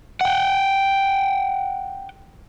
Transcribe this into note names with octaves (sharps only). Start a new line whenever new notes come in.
F#5 G5